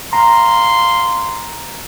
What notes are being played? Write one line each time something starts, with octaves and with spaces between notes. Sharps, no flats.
F5 A#5 C6